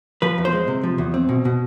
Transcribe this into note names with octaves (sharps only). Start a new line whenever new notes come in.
F3 B4
E2
C5
G#3
C3
F3
E2
C4
B2
B2